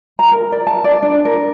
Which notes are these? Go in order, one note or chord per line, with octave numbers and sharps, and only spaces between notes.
A#5
A#4
D5
A5
D5
D4
A#4